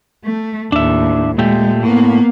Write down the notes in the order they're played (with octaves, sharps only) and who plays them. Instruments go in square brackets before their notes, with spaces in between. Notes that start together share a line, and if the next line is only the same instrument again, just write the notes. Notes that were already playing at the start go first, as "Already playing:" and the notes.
[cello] A3
[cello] D#2 A2 [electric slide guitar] D4 E5
[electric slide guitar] A#2 A3 G4 [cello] G#3
[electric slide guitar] A2 [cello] A#3 B3